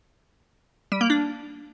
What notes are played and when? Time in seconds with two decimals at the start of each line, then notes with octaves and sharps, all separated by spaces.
0.92 G3
1.01 A#3
1.10 D4